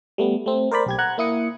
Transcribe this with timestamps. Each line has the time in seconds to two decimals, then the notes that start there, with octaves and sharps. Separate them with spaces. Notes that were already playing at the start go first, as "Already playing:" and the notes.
0.18 G3 A3 B3
0.46 A3 C4
0.71 A#4 C5 D5 B5
0.86 B1 G4 G#6
0.98 F#5 A#5 F#6 G#6
1.18 A#3 E4 D#6 C#7